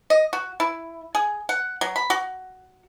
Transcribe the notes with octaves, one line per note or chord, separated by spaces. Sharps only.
D#5
F#4
E4
G#4
F#5
F#3
B5
F#4